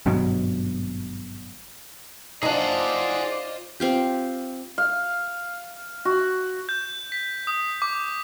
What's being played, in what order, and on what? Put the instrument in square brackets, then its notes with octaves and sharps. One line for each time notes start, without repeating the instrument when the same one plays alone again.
[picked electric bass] G#1 G2 B2 F#3
[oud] D4 D#4 [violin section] F4 C5 D#5 [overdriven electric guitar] G#4 F#5 [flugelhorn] D5
[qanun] C4 F4 G4
[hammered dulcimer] F5
F#4
[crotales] G6
B6
D#6
D6